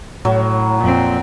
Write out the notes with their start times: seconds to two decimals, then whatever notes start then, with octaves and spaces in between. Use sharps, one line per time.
0.25 A2 F#3
0.80 F2 A#2 C4